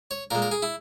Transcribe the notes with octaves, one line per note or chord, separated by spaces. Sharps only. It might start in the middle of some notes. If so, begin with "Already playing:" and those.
C#5
A#2 G#3 A#4
A#4
G#4
E4